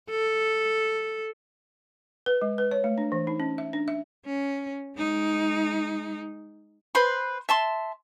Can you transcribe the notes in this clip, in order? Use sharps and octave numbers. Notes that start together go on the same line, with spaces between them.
A4
B4
G#3
B4
C#5
A3
D4
E3
D#4
C#4
E5
D4
E5
C#4
G#3 D#4
B4 C5 B5 C6
E5 A5 C6